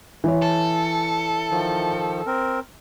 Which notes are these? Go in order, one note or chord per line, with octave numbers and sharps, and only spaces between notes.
E3 C#5
A4
D#3 F3
C4 A#4